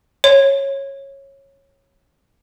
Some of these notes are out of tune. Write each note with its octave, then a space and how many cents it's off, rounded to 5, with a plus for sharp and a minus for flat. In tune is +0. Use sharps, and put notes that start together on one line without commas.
C#5 -15